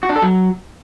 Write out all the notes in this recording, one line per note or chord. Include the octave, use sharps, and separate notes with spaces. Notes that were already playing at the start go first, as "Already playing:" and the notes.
F#4
D4
A4
F#3